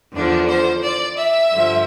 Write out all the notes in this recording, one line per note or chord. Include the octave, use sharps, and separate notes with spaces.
E2 D3 F3 D4
C5
D5
E5
G2 D3 F3